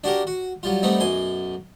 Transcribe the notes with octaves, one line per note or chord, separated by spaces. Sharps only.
D4 F#4 G4 A#4
F#4
F#3 G3 F4
G3 A3 B3 C4 D#4
B1 F#2 G#5 C6